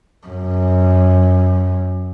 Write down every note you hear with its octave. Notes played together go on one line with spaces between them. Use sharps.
F#2